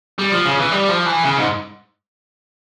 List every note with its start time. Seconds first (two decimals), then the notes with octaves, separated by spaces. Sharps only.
0.19 G3
0.32 F3
0.45 C#3
0.59 E3
0.72 G3
0.89 F3
1.06 E3
1.23 C#3
1.37 G#2